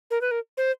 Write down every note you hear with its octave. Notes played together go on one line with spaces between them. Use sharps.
A#4
B4
A#4
C5